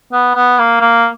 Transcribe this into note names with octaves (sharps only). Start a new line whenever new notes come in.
B3
B3
A#3
A#3